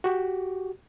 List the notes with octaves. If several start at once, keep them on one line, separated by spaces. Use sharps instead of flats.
F#4 G4